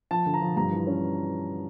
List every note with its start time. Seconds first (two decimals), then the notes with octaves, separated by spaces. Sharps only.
0.11 F3 A5
0.26 D3
0.34 A#5
0.42 F3
0.56 G2 A#5
0.71 E3
0.87 C#4